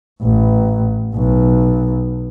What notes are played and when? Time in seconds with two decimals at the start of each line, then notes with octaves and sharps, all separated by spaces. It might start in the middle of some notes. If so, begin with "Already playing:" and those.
0.22 A1
1.15 B1